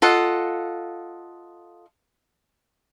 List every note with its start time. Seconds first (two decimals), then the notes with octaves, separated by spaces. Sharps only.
0.02 F4 A4 D#5 F#5